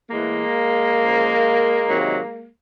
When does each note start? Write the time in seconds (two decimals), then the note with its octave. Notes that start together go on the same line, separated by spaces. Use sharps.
0.11 A2 E3 G#3 A#3
1.00 C#3 F3
1.88 C3 D#3 F#3